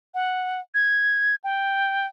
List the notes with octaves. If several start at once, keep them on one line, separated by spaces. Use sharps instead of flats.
F#5
G#6
G5